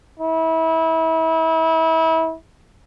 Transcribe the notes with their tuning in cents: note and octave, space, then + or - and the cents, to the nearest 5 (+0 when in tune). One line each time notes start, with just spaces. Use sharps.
E4 -30